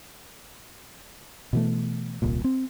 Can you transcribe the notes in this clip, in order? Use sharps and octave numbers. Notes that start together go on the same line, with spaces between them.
B2 E3 A3
D#1 C2 A#2
C4